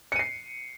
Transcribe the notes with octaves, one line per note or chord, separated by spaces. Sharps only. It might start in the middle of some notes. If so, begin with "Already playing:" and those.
C7 C#7 D#7